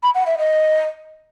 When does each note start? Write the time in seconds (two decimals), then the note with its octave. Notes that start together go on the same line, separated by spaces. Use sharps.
0.03 B5
0.15 F#5
0.26 E5
0.38 D#5